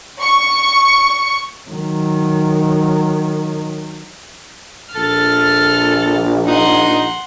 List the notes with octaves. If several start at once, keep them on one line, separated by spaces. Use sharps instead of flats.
C#6
D#3 F#3
A#1 A4 F6 A6
D#4 F#5 C6